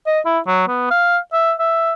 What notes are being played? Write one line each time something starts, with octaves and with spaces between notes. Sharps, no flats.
D#5
E4
F#3
B3
F5
E5
E5